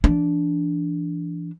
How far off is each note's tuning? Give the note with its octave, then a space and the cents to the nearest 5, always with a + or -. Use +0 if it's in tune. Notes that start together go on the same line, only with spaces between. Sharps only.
E3 +30 D4 -10